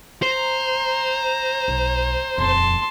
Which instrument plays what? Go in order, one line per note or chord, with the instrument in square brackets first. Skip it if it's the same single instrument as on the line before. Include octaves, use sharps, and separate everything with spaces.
[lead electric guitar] C5 [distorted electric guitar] A#5
[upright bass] B1
[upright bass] D#1 F2 [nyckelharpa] A5 C6